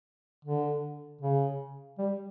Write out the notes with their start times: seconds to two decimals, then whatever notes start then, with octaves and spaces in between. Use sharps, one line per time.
0.45 D3
1.21 C#3
1.98 G3